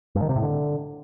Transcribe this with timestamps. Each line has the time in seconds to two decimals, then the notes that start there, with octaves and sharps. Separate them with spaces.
0.15 G2
0.22 D#3
0.29 C3
0.36 A2
0.43 D3